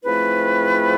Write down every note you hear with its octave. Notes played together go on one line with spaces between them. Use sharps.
G#2 F3 A3 C4 E4 B4